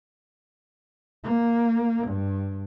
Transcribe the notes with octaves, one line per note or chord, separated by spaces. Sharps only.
A#3
G2